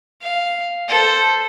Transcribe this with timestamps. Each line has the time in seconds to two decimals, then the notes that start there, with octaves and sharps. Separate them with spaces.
0.22 F5
0.88 A4 C5